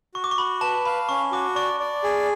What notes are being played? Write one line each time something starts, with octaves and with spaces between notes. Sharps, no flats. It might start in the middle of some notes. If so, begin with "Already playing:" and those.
F#4 C#6
D6
C#6
F#4 B5
B4 A5
F5 B5
C#4 C#6
F#4 D6
D5 C#6
D5
G#4